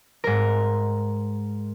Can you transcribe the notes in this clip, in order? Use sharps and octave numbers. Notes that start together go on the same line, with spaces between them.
G#2 A#4